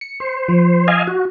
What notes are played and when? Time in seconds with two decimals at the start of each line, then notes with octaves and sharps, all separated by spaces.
0.01 C#7
0.20 C5
0.48 F3
0.88 D#5 F5 G#5
1.07 F#4